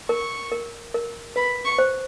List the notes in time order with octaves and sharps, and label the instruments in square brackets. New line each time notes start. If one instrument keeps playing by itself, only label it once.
[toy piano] A#4 [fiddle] C#6
[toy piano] A#4
A#4
[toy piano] B4 [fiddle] B5
[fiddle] C#6
[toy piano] C5